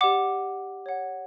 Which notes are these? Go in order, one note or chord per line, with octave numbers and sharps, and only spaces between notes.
G4 D5 F#5 D6
C#5 F#5